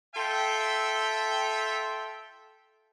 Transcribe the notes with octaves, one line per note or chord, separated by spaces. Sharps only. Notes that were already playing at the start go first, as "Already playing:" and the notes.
F4 A4 E5 G5